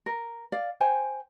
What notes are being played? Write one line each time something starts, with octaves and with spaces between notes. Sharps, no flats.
A#4
D5 F5
C5 G5 G#5